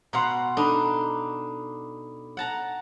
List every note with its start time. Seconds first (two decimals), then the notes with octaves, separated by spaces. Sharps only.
0.13 B2 F5 F#5 A#5 C6
0.57 D4 D#4 A4 B5
2.37 F#5 A5 A#5